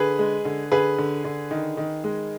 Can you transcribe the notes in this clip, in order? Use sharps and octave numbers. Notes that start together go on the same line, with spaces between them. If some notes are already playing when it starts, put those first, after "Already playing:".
Already playing: D3 G#4 B4
G#3
D3
D3 G#4 B4
D3
D3
D#3
D#3
G#3